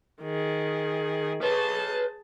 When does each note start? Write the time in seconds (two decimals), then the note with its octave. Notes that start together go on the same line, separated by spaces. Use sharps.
0.22 D#3 G#4
1.43 G#4 B4 C#5 A5